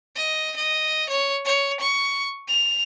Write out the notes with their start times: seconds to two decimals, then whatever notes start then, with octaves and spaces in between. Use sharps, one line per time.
0.16 D#5
0.56 D#5
1.09 C#5
1.45 C#5
1.80 C#6
2.48 F7